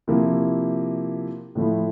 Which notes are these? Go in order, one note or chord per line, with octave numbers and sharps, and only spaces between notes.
C3 F3 A#3 E4
A2 F3 A3 E4